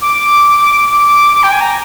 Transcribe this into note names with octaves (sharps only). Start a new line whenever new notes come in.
D6
D6
G5
G#5
A#5